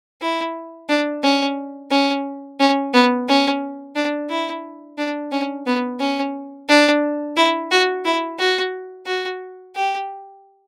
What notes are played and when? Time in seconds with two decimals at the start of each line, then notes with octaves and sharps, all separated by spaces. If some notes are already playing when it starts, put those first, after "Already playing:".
0.21 E4
0.89 D4
1.23 C#4
1.91 C#4
2.60 C#4
2.94 B3
3.28 C#4
3.96 D4
4.30 E4
4.98 D4
5.32 C#4
5.66 B3
6.00 C#4
6.69 D4
7.36 E4
7.71 F#4
8.05 E4
8.39 F#4
9.06 F#4
9.76 G4